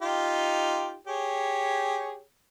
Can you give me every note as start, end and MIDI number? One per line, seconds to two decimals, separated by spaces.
0.02 0.96 63
0.02 0.96 65
0.02 0.96 67
1.07 2.21 67
1.07 2.21 68
1.07 2.21 73